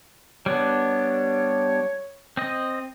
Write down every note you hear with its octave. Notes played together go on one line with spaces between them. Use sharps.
G3 B3 D4 C#5
C4 D#5